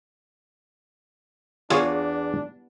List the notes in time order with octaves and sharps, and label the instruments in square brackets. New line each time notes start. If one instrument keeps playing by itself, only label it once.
[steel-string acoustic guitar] E2 [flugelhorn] D4 [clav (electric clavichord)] F4 G#4 C#5